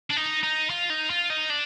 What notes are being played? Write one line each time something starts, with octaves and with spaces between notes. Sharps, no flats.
D4
D#4
D#4
F4
D#4
F4
D#4
D4